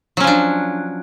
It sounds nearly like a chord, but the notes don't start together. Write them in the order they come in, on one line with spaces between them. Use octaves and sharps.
F#3 C#4 F3 D4